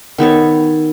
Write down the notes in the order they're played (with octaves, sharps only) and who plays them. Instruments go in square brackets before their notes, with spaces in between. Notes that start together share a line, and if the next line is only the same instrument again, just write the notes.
[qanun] D#3 B3 A4 C#5